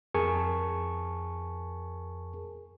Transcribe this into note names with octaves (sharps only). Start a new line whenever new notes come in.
F2 G#4 A#4 G#5 A5 C#6